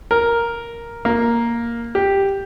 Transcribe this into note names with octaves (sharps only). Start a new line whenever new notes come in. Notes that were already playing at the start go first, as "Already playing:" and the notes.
A#4
A#3
G4